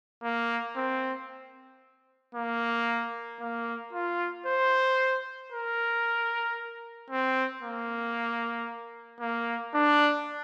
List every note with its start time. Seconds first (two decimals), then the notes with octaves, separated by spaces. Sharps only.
0.24 A#3
0.76 C4
2.35 A#3
3.41 A#3
3.93 F4
4.46 C5
5.52 A#4
7.10 C4
7.63 A#3
9.20 A#3
9.74 D4